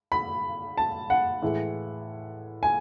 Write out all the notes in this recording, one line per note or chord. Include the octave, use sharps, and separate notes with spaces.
B5
A5
F#5
A2 E3 G#3
G#5